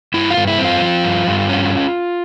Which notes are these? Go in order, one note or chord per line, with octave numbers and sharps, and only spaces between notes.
G2 E4
F4
G2
E4
C4
F4
F3
G2
G2
C#4